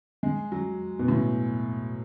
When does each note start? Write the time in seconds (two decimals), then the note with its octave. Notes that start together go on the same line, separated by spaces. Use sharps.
0.23 G#3
0.52 F#3
0.99 B2
1.08 A2